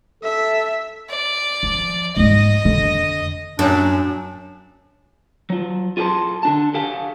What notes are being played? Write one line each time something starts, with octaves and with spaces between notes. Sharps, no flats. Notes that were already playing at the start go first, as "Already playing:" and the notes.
A4 E5
D5
F3
G#2 G#3 D#5
F2 D3
F#2 D4
F#3 F4
F4 G#4 A4 E5 A5 C6
D3 D4 A5
G4 A4 F5 G#5